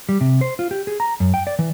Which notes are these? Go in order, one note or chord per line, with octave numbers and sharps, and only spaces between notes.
G3
C3
C5
F4
G4
G#4
A#5
F#2
G5
D5
E3